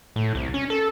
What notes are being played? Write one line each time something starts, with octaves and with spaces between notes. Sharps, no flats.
A2
C2
C#4
A4